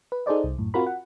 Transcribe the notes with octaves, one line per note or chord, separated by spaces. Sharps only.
B4
D#4 G#4 A4 C5 D5 D#5
C2
F#2 A2
C4 F4 F#4 A#4 B5
F#5